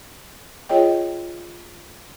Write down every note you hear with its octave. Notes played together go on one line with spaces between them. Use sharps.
F4 G#4 C#5 D#5 G5